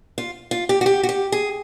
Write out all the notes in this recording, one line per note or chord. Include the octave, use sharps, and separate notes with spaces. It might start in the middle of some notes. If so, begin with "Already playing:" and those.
F4
F4
G4
F#4
G4
F#4
G4
G#4